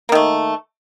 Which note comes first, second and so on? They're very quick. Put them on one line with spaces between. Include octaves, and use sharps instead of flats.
A#3 D#3 A3